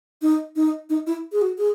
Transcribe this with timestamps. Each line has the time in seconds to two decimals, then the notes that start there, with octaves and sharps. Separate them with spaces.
0.22 D#4
0.56 D#4
0.90 D#4
1.07 E4
1.32 G#4
1.42 F#4
1.58 G#4